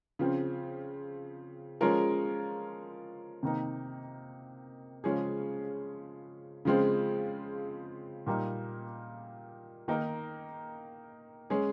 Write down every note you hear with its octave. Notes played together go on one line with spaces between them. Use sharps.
C#3 F3 C4
F3 G#3 C#4 F4 A#4
C3 D#3 A#3 D#4
C#3 F3 G#3 C#4 G#4
C#3 F3 G#3 C4 F4
A#2 G3 A#3 D#4
D#3 A#3 D#4 A#4
G#3 C#4 G#4